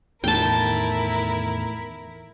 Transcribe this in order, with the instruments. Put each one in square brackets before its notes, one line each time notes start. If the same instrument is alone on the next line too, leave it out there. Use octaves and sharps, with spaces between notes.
[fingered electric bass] E2 A2 D#3 [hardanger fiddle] E4 A#4 [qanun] G5 A5